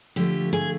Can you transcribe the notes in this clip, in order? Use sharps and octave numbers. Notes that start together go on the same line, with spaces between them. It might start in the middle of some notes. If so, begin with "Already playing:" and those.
D3 F3 A3 G4
G#4